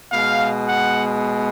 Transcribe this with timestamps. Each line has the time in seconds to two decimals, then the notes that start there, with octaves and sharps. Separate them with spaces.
0.13 B2 G#3 F5
0.67 F#5